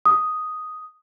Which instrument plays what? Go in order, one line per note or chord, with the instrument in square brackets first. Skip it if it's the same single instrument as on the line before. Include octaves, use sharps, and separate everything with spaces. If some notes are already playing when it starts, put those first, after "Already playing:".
[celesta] D#6